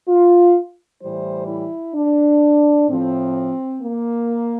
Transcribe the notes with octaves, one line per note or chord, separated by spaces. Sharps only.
F4
A2 E3 G3 C5
E4
D4
A2 F3 C4
A#3